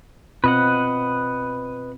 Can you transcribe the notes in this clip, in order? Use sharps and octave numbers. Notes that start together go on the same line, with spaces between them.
B2 C4 F4 B4 D#5 F#5